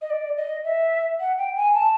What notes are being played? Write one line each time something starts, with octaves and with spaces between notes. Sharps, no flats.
D#5
D5
D#5
E5
F#5
G5
G#5
A5